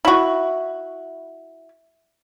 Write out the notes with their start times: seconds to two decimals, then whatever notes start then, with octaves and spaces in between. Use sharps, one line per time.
0.05 E4 F#4